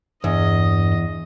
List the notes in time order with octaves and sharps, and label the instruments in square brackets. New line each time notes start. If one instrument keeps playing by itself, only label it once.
[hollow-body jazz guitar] E2 [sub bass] G2 [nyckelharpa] D#5